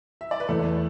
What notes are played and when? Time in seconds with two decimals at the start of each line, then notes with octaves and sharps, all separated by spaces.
0.21 E5
0.31 D5
0.40 B4
0.48 E2 A3 A4